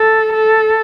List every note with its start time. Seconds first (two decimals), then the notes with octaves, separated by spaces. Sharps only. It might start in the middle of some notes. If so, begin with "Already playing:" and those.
Already playing: A4
0.33 A4